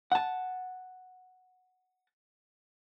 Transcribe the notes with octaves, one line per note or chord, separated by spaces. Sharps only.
F#5 A5